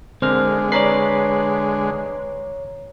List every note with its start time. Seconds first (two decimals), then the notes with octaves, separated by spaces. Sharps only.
0.22 D3 G#3 C4 A#4 C5 F6
0.72 B4 C#5 D5 A#5 C7